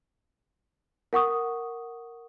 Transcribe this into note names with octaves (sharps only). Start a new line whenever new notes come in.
A#4 F#5 C#6 D#6